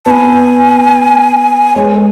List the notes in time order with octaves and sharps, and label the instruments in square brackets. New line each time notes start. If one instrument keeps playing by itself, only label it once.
[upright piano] B3 [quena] G#5 A5
[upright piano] G#3 [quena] C#5
[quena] B4
A4